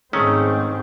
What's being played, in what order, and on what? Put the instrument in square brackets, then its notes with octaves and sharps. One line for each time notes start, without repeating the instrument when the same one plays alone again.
[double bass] G#2 C4 [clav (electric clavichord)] D#3 A3 C#4 [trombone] G#3